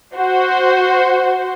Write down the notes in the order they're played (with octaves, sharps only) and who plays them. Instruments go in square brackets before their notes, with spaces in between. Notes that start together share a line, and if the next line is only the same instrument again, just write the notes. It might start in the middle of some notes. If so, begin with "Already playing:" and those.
[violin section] F#4 C5